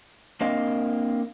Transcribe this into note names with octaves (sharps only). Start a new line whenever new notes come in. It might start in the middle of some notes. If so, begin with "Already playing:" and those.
A#3 C4 D4 A#4 D#5 F5